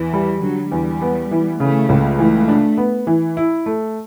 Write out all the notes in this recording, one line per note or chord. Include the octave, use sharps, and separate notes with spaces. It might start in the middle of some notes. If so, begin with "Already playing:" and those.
Already playing: E2 E3
G3
D3 F#3
E2 G3
B3
E3
C#3 A3
C#2
E3 A3
D4
B3
E3
E4
A3